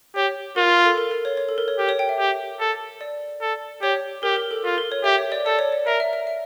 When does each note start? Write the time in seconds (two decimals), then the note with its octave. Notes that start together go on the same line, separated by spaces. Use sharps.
0.16 G4 C#5
0.56 F4 A#4
0.70 A#4
0.84 A4
0.98 A#4
1.11 A#4
1.25 C#5
1.37 C#5
1.49 A4
1.58 A#4
1.68 C#5
1.79 G4 A#4
1.89 C#5
1.99 G5
2.09 E5
2.19 G4
2.60 A4
3.01 D5
3.41 A4
3.82 G4 C#5
4.23 G4 A#4
4.36 A#4
4.51 A4
4.64 F4 A#4
4.78 A#4
4.92 C#5
5.04 G4 E5
5.18 C#5
5.32 D5
5.46 A4 D5
5.59 C#5
5.72 D5
5.86 A#4 E5
6.00 E5
6.13 E5
6.27 E5